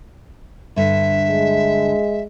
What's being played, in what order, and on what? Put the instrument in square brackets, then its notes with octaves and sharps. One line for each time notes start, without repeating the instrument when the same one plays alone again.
[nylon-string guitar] G2 D3 [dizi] E5
[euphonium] G#3